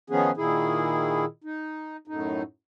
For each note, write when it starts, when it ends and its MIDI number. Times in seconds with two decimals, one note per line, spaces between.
0.10 0.31 51
0.10 0.31 53
0.10 0.31 59
0.10 0.31 61
0.10 0.31 68
0.37 1.25 46
0.37 1.25 51
0.37 1.25 64
0.37 1.25 68
1.44 1.97 63
2.08 2.42 42
2.08 2.42 45
2.08 2.42 63